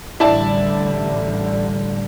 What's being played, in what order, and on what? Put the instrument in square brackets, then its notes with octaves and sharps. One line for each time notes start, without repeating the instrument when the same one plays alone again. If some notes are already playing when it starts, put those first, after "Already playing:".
[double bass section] A1 D3 G3 [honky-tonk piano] E4 D5 A5